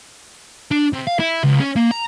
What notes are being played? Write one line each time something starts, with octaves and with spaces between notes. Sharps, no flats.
D4
C3
F5
E4
C#2
C#4
A#3
A#5